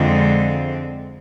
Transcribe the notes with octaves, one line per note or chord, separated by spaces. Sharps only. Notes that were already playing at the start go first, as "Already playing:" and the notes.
Already playing: F2 D3 G#3 C4